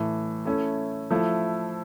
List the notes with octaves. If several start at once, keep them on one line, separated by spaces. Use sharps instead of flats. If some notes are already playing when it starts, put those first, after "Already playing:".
Already playing: A2 E3 A3
A3 C#4 E4 A4
F3 A3 E4